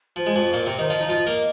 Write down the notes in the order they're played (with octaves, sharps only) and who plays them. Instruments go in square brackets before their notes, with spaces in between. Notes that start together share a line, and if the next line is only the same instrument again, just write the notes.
[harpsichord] F3 [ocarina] C5
[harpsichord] G#3
F2 F3
A#2 A#3
C3 C4
[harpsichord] D#3 D#4 [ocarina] C5
[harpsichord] F3 F4 [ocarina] D#5
[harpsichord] D#4
F3 F4
A#3 A#4